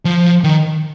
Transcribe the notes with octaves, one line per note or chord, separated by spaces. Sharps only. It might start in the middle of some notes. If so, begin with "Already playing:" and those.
F3
D#3